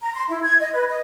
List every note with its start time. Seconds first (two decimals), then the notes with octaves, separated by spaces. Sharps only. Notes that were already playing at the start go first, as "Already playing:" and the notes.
0.01 A#5
0.15 C6
0.29 E4
0.43 G#6
0.60 D#5
0.73 B4
0.88 D#5